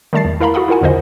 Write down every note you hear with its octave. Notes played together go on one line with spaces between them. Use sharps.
D#3 G3 A3 A5 A6 C7
E2
E4 A#4 F5 A#5 B5
F#4 A4 F#5 B5 D#6
E4 F4 A#4 F#5 G#5
B1 E2 D3 A#4 C5 D#5